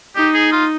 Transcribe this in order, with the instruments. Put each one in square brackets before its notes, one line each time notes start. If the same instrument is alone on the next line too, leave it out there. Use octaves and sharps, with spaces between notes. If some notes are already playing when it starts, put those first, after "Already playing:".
[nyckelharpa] D#4 [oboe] G4
[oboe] G#4
F4